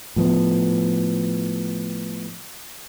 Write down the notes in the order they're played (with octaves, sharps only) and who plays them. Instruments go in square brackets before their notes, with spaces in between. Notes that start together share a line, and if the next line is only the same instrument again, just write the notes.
[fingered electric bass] A2 F3 B3